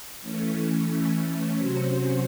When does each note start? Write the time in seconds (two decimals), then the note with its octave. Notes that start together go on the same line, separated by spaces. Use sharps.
0.22 E3 A3 C#4
1.58 C3 F#3 C#4 F#4 C5